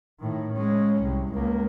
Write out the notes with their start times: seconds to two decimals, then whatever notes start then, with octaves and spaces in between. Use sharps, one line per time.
0.20 A2 D#3
0.53 G#3 C#4
1.02 C2
1.34 C#2 A#3